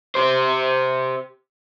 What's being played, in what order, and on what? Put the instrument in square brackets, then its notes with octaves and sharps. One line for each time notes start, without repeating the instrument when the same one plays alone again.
[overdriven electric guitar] G4 C5